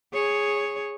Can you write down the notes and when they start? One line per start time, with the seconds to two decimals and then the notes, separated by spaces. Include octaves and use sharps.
0.13 G#4 C#5